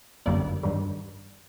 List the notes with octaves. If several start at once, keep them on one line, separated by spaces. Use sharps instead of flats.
G1 F#2 D3 G3 A#3 D5
G2 D#3 G3